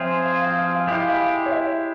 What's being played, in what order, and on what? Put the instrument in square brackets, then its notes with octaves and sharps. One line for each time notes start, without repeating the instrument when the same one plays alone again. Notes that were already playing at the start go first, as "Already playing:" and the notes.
Already playing: [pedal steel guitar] F3 C4 F4 G#4 C5 [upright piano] C#5 E5
[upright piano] F5
F5
F5
F5
[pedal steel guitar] G#3 E4 G4 [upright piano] F5
[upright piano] F5
C#5
E5